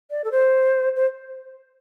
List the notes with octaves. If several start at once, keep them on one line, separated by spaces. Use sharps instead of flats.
D5
A4
C5
C5